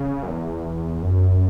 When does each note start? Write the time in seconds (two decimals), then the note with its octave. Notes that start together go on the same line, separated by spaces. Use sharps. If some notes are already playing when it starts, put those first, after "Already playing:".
Already playing: C#3
0.23 F#2
0.28 E2
1.02 F#2